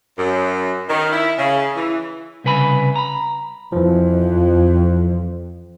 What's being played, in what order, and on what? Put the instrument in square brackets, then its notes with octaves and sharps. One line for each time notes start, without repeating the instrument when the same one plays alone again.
[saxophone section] F#2
D#3
E4
C#3
E3
[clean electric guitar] C2 C#3 B4 G#5 B5
A#5 B5
[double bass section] F2 [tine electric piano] E3 F3